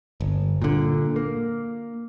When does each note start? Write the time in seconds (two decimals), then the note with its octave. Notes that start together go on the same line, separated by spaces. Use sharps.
0.21 G1
0.62 A#2 D3
1.16 A#3